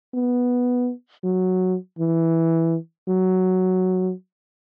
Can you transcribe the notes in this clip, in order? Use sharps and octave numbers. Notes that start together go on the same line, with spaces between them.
B3
F#3
E3
F#3